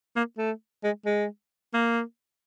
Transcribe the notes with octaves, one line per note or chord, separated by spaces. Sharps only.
A#3
A3
G#3
G#3
A#3